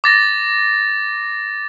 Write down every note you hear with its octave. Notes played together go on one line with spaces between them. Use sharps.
D6 A6 A#6